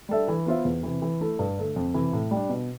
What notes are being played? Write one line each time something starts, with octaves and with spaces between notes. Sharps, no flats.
G3 D4 A4 E5
E3
B3 F4 C5 E5
E2
C3 E3
E3
A3 E4 A4
G2
D3 A3
F2
C3 E3
A2
G3
D4
B2